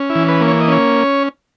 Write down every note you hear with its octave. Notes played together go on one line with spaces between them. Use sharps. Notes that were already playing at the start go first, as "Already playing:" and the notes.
Already playing: C#4
E4
E3
B4
A#3
C#5
D#5
C#4 C#5